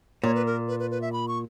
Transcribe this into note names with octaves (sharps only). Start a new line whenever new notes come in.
A#2 C#5
B4
A#4
B4
B4
B4
E5
B5
C#6